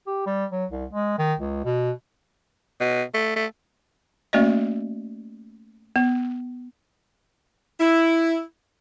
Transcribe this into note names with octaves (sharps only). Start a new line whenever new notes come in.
G4
G3
F#3
C2
G#3
D#3
C#2
B2
B2
A3
A3
A3 A#3 C#4 F#4 D5 D#5
B3
E4